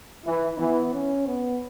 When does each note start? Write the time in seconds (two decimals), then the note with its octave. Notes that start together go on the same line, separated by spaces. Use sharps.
0.25 E3 E4
0.59 E3 B3
0.93 C#4
1.27 B3